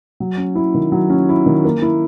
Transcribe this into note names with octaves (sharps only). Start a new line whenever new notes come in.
F#3
C#4
E4
D#3
F#3
C#4
E4
D#3
A#3
E4